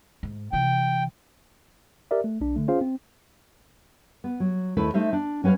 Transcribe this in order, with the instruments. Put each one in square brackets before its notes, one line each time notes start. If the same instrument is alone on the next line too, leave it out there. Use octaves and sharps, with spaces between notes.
[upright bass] G#2
[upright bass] C3 E3 [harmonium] G5
[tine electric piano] G4 A#4 D5 E5
A3
B1 D4
D3 A3
C#4 F4 G#4 C5 F5
C4
[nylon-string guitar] B3
F#3
D#2 A3 E4 B4
A3 D#4 C5 E5 F5
D4
F#3 C#4 B4 C#5 F5